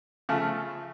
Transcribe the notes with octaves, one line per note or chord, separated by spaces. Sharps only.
C#3 F3 A3